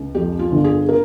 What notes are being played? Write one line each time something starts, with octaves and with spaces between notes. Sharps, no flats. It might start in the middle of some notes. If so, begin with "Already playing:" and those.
Already playing: C#2
F2 G4
F4
G1
G#4
A#4